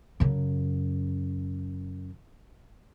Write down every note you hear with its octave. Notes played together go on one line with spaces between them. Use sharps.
F#2 C#3